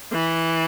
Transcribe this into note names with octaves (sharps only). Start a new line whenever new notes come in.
E3